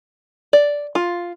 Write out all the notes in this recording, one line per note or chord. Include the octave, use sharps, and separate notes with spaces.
D5
F4